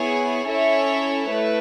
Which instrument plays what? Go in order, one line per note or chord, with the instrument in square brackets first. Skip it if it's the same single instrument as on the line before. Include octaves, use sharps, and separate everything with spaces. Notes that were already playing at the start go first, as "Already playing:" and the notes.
Already playing: [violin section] B3 E4 G#4 C#5 G#5
C#4 E4 A4 C#5 E5
A3 E4 B4